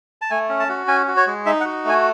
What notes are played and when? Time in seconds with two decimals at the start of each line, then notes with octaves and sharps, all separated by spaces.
0.22 A5
0.30 A3 G#5
0.49 C#4
0.60 A5
0.69 F#4
0.88 C#4 G#5
1.08 F#4
1.17 C#5
1.26 G#3
1.46 D#4 E5
1.60 F#5
1.65 F#4
1.85 A3 G#5